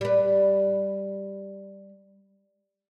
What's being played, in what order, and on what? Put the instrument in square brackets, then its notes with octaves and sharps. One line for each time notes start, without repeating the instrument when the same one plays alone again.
[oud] G3 B4